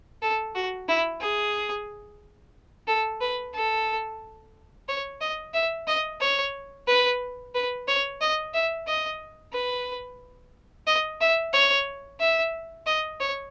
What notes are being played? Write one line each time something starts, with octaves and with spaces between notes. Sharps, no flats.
A4
F#4
E4
G#4
A4
B4
A4
C#5
D#5
E5
D#5
C#5
B4
B4
C#5
D#5
E5
D#5
B4
D#5
E5
C#5
E5
D#5
C#5